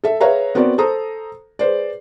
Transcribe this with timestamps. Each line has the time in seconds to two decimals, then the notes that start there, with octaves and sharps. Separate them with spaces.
0.04 A4 E5
0.21 G#4 B4 C#5 E5 F5 A#5
0.55 B3 C4 F#4 A#4 D5
0.78 A4 C5 A#5 D#6
1.59 G#4 B4 C5 D5